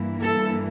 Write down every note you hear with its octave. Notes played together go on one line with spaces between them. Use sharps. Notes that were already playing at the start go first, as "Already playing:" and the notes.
Already playing: G2 E3 A#3 E4
A4